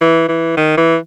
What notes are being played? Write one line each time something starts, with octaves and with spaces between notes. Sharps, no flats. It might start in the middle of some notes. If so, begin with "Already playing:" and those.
E3
E3
D#3
E3